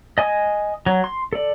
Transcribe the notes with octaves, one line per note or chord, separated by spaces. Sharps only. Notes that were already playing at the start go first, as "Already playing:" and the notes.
D#5 G#5 D#6
F#3
C6
A4 D5